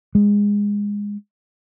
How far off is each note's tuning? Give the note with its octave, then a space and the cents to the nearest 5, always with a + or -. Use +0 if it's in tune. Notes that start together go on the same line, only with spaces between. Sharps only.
G#3 -20